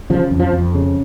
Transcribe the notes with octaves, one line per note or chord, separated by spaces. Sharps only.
C#3 F3
F2
F3
F2
C#3